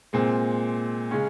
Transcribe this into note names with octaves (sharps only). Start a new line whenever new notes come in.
A#2 G#3 C4
C#3 G#3 C#4